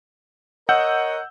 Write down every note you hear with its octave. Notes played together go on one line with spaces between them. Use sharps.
A#4 C#5 D#5 F#5 E6 G6